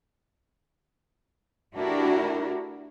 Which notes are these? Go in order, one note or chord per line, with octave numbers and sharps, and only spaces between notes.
A3 D4 E4 F#4 G4 A#4